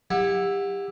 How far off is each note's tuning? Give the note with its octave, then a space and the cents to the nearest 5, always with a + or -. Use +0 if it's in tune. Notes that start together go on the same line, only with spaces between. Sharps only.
E4 +0 G4 +25 F#5 -25